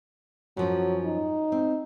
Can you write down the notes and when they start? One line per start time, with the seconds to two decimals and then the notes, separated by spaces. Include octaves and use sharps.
0.57 F#2 F3 F#3 C#4
1.05 D#4
1.52 C4